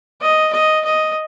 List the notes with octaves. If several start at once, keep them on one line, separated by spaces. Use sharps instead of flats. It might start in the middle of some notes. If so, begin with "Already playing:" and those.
D#5
D#5
D#5